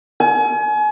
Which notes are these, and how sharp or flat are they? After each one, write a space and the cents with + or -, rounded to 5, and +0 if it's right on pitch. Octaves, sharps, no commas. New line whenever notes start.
G#5 +35